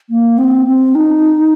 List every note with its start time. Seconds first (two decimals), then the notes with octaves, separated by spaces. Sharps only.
0.10 A#3
0.38 C4
0.67 C4
0.95 D#4